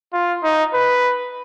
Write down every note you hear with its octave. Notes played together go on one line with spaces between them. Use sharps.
F4
D#4
B4